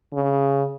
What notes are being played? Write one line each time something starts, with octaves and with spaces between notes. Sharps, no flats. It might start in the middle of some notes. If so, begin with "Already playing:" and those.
C#3